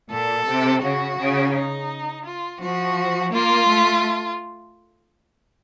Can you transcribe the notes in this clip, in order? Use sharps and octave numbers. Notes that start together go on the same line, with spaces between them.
A#2 A4
C3
C#3 F#4
C#3
D#4
F4
F3 F#4
A#3 F4
A3